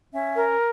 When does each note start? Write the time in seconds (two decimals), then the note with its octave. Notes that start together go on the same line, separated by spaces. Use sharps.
0.12 C#4 E5
0.36 A#4